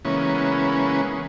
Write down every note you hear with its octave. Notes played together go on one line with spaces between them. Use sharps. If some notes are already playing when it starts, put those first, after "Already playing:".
C#3 E3 G#3 A#3 B3 C#4